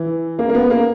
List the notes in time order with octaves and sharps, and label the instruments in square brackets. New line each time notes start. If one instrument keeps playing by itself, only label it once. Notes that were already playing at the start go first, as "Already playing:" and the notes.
Already playing: [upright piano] E3
A#3
A#3
B3
A#3